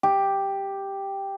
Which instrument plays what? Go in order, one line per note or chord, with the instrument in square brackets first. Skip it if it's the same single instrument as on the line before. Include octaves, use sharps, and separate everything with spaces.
[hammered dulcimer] G4